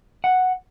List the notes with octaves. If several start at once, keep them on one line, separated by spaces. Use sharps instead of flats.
F#5